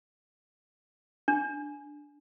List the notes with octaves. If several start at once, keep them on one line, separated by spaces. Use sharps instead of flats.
D4